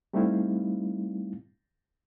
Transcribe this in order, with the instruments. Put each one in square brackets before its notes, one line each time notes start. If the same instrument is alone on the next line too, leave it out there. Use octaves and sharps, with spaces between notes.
[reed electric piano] G3 A3 C4 D#4 E4 F5